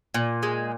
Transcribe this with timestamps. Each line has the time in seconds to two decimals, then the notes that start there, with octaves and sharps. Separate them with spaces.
0.14 A#2
0.43 G#3